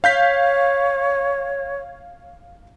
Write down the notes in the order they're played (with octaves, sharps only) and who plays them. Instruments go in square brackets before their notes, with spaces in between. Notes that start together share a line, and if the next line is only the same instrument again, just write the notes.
[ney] C#5 [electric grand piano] F5 G6 B6